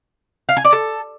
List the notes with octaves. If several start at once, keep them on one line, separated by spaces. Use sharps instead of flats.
F5
G#5
D5
A4